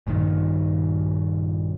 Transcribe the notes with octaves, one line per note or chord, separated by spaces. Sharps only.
A#1 G2 A#2 D#3